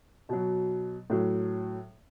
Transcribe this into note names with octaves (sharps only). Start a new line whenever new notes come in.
B2 F#3
A2 F#3